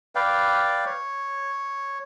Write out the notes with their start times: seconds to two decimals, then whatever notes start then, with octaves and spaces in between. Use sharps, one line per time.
0.15 B4 D5 F5 G5
0.86 C#5